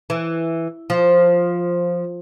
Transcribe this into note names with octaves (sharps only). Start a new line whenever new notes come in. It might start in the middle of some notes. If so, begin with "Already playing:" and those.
E3
F3